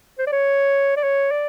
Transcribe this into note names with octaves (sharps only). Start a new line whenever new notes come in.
C5
D5
C#5
D5
C#5
D5